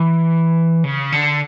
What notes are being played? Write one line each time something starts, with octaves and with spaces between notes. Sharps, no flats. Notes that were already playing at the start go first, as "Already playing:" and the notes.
Already playing: E3
C#3
D3